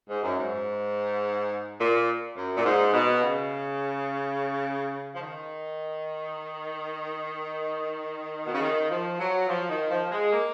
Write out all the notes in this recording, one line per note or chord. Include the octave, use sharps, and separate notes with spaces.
G#2
F#2
G#2
A#2
F#2
A#2
G#2
B2
C#3
F3
D#3
B2
C#3
D#3
F3
F#3
F3
D#3
F3
G#3
A#3